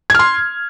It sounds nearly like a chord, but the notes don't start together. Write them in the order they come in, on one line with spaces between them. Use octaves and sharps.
G#6 F6 C6